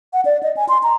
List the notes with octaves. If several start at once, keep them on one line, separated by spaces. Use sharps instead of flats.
F#5
D5
D#5
G#5
C6
A#5